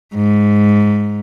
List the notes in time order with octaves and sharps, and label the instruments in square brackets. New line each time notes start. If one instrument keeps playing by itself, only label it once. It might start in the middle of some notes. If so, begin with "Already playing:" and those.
[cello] G#2